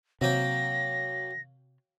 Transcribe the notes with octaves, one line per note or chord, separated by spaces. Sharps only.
C3 F#3 A#3 G5 A#6